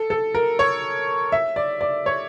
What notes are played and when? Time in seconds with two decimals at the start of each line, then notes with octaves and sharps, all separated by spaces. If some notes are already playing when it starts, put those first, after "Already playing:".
Already playing: A4
0.10 A4
0.34 A#4
0.59 C#5
1.32 E5
1.56 D5
1.81 D5
2.06 C#5